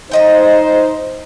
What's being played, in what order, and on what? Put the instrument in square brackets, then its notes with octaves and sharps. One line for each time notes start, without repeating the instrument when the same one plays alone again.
[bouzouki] F3 D#5 G5 [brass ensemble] D#4 C5